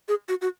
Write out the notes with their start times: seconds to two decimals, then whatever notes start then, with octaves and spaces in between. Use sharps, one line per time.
0.08 G#4
0.29 F#4
0.42 F#4